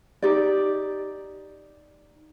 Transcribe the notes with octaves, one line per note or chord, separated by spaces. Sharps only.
D#4 G4 D5